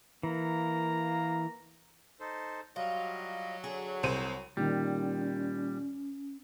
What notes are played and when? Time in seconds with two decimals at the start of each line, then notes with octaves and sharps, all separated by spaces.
0.23 E3 A#3 A#5
2.20 D#4 A4 C5
2.76 F#3 G3 F4 D#5
3.64 D3 G#4
4.03 C2 C5 D#7
4.57 A#2 D#3 G3 C#4